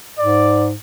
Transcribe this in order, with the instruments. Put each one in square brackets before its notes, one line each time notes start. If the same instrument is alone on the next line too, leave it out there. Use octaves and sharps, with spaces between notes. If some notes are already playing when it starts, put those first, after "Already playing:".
[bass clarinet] G#2 [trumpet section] D5